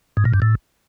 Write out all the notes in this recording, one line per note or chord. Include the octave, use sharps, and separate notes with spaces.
G#2
A#2
G2
A2